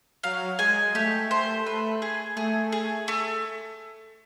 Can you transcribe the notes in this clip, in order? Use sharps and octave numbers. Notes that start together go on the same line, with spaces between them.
F#3 F5
G#3 G#5
A3 G4
C5
B4
G#4
A3 G#4
G#4
A3